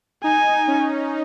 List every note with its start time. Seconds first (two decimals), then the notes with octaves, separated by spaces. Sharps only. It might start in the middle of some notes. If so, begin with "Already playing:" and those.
0.24 D#4 G#5
0.68 C#4